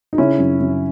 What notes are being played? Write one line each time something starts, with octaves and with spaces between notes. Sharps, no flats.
D#4
C#3 C#4 E4
F#2
F#2